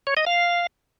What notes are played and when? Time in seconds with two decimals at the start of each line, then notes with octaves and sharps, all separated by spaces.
0.07 C#5
0.17 D#5
0.27 F5